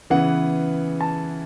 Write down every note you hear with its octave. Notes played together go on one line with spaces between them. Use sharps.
C#3 E3 B3 F#5
A5